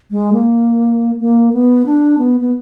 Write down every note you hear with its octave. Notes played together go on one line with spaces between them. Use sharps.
G#3
A#3
A#3
B3
D4
B3
B3